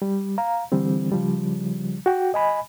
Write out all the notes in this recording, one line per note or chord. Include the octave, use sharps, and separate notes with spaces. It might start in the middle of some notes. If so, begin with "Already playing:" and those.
G3
F5 A#5
D3 E3 G3 C4
C#3 F3 G3
F#4 G5
D#5 G#5 B5